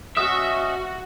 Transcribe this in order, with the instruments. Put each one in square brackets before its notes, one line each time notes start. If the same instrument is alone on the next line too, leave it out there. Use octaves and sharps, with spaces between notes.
[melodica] C#4 D#5 [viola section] F#4 [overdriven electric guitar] E5 [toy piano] D#6